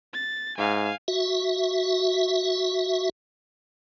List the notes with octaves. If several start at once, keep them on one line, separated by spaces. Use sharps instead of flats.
A6
G#2 F5 G#5
F#4 E5